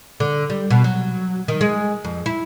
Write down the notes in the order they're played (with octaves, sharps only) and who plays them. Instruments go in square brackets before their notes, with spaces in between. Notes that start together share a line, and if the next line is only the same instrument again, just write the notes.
[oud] D3
G3
B2
F#3
D#3
G#3
F2
E4